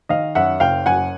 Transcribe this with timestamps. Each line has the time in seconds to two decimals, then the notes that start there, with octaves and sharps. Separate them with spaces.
0.09 D#3 D#5 F5
0.35 F#2 E5 F#5
0.60 F#1 F5 G5
0.86 F#2 F#5 G#5